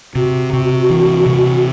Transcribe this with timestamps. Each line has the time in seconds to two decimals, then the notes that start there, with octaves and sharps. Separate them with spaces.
0.15 C3 F#4
0.53 C3
0.90 E3
1.26 C3